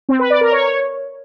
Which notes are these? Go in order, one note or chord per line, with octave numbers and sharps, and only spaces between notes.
C4
B4
D5
A#4
C#5